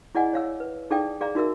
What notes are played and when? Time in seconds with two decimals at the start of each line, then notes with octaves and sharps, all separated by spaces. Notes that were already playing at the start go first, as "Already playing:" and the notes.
0.15 E4 G#4 D5 D#5 F#5 G#5
0.33 C#5 F5 E6
0.60 B4
0.91 D#4 G#4 A4 D5 F5 G5
1.21 G#4 D5 F5 A#5
1.35 D#4 F#4 A#4 E5 E6